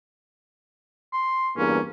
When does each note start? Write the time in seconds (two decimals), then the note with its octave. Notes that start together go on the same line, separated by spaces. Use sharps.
1.13 C6
1.57 E2 G2 A#3 C#4